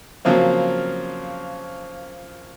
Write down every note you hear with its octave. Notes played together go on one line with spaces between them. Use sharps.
C#3 F3 F#3 A#3 C4